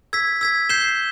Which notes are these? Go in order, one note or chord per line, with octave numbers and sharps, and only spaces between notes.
E6 G#6 B6
E6 G#6 B6
G6 C7 E7 G7